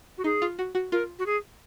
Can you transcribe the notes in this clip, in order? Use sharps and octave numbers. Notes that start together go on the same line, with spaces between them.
F#4
D#4 G#4
F4
F#4
F#4
F4 A#4
F#4
G#4